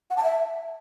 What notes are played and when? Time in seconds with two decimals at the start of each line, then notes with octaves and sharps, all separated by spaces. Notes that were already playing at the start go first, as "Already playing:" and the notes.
0.10 F#5
0.17 A5
0.23 E5